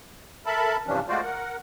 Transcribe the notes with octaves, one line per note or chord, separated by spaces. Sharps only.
A4 A#4 E5 A5 B5
G2 C3 E3 F3 C#4 D4
G#3 A3 F4 F#4 C5 D5
A#4 F#5